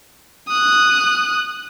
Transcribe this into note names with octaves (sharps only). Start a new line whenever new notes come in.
D#6 F#6